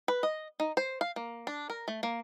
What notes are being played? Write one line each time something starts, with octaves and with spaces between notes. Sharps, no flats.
B4
D#5
D#4
C5
F5
A#3
D4
A#4
A3
A#3